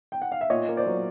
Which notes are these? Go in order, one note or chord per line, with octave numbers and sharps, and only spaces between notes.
G5
F#5
F5
E5
A#2 C#5 D#5
A#3
C5 D5
F#3